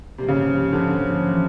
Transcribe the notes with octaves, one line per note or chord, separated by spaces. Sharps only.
G#2 C3 F3 A#3 D4
C#3
C3
G#2 D3 F3 A#3 D4
E3